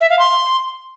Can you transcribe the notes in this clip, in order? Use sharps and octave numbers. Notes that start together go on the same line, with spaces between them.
E5
F5
C6